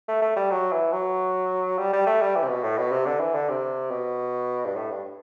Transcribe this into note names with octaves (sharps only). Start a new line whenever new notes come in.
A3
A3
G3
F#3
E3
F#3
G3
G3
A3
G3
E3
C3
B2
A2
B2
C3
D3
E3
D3
C3
B2
G2
A2
G2